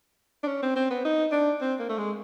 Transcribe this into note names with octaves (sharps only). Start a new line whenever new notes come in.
D4
C#4
C4
C4
B3
D#4
D4
C4
A#3
A3
G#3